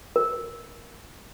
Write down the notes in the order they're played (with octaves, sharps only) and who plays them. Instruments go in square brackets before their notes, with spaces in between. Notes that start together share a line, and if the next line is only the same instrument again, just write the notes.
[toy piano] A#4